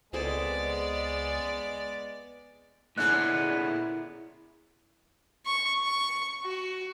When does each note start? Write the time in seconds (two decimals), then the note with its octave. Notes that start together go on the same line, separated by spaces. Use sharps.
0.13 C#2 G#3 B3 C4 G#4 A4 D5
2.98 A#2 D3 G#3 B3 C#4 E4 F#6
5.45 C#6
5.82 C#6
6.44 F#4